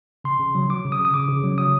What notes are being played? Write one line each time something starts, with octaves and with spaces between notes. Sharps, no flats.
C#3 C6
C#3
F#3
F#3 D6
C#3
D#6
C#3
D#6
C#3 D6
C#3
F#3
F#3 D#6